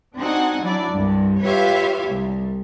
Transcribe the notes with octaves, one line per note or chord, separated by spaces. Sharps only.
C4 D4 D#4 F#4 F#5 G#5
F#3 D4 E4 D5
C2 G2
F4 G4 B4 C#5 E5 F5
C2